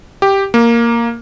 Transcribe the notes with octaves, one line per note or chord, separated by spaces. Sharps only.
G4
A#3